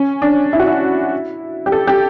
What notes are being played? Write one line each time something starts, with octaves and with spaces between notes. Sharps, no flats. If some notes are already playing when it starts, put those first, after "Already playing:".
Already playing: C#4
D4
E4
F#4
E4
G4
A4
G4